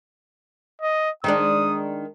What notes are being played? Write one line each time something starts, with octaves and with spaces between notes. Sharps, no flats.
D#5
D#3 G#3 D4 D#6